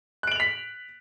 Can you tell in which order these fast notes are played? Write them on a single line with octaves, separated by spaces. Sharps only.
F#6 D7 F#7 F7 B6